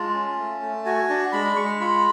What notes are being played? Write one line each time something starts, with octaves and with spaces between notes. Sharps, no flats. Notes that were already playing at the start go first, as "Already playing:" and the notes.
Already playing: G#3 F4 A5
C#4
A3
A3
F#4 G#5
D4 A5
G#3 B5
G#3 C#6
F4 B5